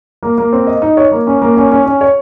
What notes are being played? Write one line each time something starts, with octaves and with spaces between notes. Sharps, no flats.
A#3
A#3
C4
D#5
D#4
C#5
A#3
C#4
A#3
C#4
C#4
C#4
C#5